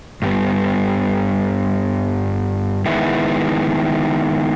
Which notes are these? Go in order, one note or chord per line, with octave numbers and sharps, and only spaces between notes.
G2 G3 B3
D#3 G#3 B3 E4